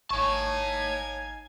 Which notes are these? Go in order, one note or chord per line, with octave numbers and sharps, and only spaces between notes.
G#1 D#4 C#5 F5 G#5 A5 C#6